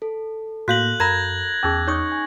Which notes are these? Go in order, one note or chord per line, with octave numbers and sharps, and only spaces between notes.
A4
A2 A#3 F#4 F5 F#6 G6 A#6 F#7
F#2 A#4 A#5 B5 G#6 A#6
E2 C#4 D#4 G#4 D6 E6 A6
D#4 C#5 C#6 D#6 G6
G#5